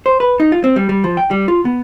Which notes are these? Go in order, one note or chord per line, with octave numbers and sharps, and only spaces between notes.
C5
B4
D#4
F4
C4
G3
G3
F3
G5
G3
F4
B3